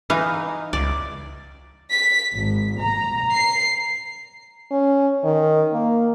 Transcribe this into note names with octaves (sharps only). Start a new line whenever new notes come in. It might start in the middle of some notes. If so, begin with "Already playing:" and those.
E3 D#4 F5
C#2 D5
B6
G#1
A#5
C7
C#4
D#3
A#3